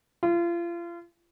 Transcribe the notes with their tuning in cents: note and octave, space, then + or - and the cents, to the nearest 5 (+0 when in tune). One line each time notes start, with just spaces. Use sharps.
F4 -35